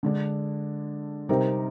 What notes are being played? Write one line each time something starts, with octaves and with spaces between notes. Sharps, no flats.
D3 G#3 D4
C3 G3 C4 D#4 A#4